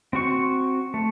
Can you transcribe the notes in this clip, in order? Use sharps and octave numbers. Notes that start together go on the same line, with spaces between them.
C4 F#4 C#6
A3